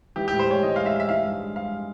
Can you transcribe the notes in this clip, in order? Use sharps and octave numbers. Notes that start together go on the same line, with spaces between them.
E3 G4
G4
A2
C5
G#3 C#5
E3 D#5
G#3 F5
E5
G#3
E5
E3 F5
G2
G#3
G#3 F5